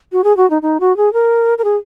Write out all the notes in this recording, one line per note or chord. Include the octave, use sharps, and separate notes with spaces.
F#4
G#4
F#4
D#4
D#4
F#4
G#4
A#4
A#4
G#4